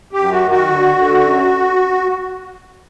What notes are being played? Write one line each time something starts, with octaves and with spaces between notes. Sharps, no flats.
G4
F#2
F#4
D#3
F#4
D3
D3
F#2